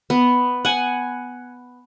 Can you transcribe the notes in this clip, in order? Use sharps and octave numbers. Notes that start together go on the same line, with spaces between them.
B3
F#5 G#5